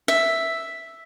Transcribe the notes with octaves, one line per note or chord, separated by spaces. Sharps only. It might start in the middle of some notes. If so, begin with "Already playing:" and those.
E5